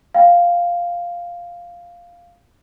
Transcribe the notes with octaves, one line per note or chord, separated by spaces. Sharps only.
F5 G5